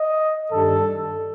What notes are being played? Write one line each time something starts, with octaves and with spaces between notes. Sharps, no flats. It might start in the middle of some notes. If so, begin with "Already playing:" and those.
Already playing: D#5
G2 D#3 G3 D4 A4